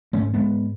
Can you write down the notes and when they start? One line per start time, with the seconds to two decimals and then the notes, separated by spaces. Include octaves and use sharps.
0.13 G#2 A3 C#4
0.34 G#3 B3